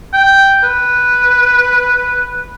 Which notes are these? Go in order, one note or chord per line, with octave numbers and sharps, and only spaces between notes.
G5
B4